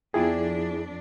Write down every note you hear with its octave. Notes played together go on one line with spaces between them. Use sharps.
F2 B3 D4 E4 F4 G#4 G5